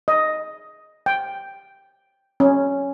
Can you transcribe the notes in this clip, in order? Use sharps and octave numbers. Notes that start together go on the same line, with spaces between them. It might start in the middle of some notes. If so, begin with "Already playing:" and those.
D#5
G5
C#4